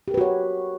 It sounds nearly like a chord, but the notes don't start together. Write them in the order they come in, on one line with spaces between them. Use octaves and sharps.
G4 A#4 B4 F#4 C#5